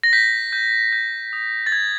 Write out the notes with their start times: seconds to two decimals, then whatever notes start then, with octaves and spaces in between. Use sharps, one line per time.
0.04 A#6
0.13 G6 B6
0.53 G6
0.92 G6
1.33 D#6
1.67 A6
1.72 G6 G#6